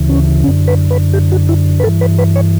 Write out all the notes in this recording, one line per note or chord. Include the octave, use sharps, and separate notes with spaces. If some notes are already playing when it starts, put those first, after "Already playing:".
Already playing: D2 C#3 E3
C#4
F#2 D3 C#4
B4
B4
G4
F#4
E4
B4
G2 E3 A4
B4
B4
C#5